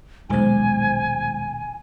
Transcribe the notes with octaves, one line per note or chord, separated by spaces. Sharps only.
D#1 B1 D#3 G#3 C5 G#5